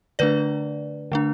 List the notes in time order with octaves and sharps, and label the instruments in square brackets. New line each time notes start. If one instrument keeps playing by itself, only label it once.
[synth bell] D3 A3 D4 B4 D5
D3 A3 D4